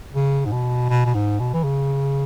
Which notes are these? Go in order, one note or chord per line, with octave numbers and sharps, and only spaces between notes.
C#3
G#2
B2
B2
B2
G#2
B2
E3
C#3